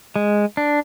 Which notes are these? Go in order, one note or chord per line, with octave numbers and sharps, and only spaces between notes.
G#3
D4